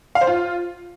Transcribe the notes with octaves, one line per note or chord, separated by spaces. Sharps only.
F5
C5
F4